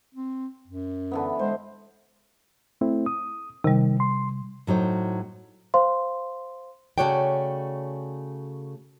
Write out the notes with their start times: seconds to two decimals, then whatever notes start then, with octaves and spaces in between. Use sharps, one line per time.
0.14 C4
0.68 F#2
1.11 D3 E3 B3
1.39 G#3 C5
2.81 A3 C4 E4
3.06 D#6
3.64 C3 D#3 G3
4.00 C6
4.67 A2 F#3 D#4 C5
5.74 C5 F5 C6
6.98 C#3 A3 F#4 C#5 D5 G5